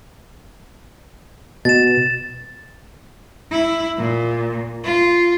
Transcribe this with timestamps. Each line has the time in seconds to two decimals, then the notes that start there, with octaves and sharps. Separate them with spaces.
1.65 B2 A6 E7
3.51 E4
3.98 A#2
4.84 F4